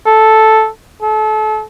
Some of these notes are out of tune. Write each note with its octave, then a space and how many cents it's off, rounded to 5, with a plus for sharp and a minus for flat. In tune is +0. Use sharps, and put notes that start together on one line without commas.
A4 -5
A4 -30